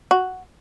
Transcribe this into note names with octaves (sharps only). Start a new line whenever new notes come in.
F#4